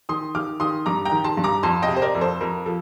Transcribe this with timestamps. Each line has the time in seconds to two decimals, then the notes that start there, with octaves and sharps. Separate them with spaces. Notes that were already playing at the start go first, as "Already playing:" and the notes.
0.09 D#3 C6 D#6
0.35 D#3 D6 F6
0.60 D#3 C6 D#6
0.86 G2 A#5 D6
1.05 G5 A#5
1.12 D#3
1.24 A5 C6
1.37 G2
1.44 A#5 D6
1.63 F2 A5 C6
1.82 D#5 G5
1.88 C3
1.96 C5
2.02 A#4 D5
2.15 F2
2.21 A4 C5
2.41 F2 A#4
2.66 F3 A4